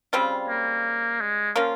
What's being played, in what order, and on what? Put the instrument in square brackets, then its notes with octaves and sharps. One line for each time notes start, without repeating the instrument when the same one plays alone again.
[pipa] C#3 G3 C4 F4
[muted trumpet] A#3
G#3
[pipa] F3 A#3 C#4 F4